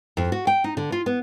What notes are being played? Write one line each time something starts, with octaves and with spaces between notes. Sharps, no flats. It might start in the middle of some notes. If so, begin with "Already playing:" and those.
F2
F#4
G5
D#4
D3
F4
B3